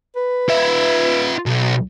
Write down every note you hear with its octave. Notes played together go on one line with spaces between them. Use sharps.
B4
F4 E5
B1